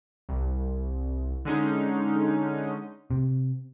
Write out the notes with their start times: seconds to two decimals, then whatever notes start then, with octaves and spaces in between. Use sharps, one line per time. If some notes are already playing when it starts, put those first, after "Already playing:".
0.29 C2
1.45 D3 G#3 C#4 D#4
3.11 C3